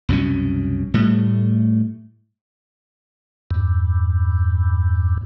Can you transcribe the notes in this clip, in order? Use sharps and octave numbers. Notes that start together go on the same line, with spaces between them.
C2 F#2 B2 C#4
A2 G3 A3
E2 G2